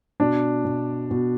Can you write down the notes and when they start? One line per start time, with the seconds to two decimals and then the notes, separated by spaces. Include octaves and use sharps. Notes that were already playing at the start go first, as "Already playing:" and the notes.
0.20 B2 D4 D5
0.65 B2
1.11 B2